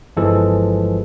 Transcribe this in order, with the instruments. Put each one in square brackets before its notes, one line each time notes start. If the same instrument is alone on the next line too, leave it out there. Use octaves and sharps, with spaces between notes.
[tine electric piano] G1 E3 F3 G#3 A4